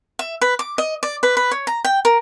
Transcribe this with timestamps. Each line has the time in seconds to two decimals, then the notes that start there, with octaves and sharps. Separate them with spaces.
0.19 E5
0.41 B4
0.59 D6
0.78 D#5
1.03 D5
1.23 B4
1.37 B4
1.51 C#5
1.67 A#5
1.85 G5
2.05 A#4